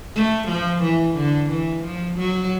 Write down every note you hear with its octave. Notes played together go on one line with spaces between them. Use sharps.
A3
F3
E3
D3
E3
F3
F#3